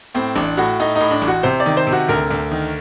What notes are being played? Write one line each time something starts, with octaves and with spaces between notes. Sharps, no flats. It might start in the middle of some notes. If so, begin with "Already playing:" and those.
A2 C4
A1 D4
A2 F#4
A2 D#4
A2 D#4
D4
A1
F#4
C3 C5
D5
D#3
C5
C3
F#4
D2 A#4
D2
D#3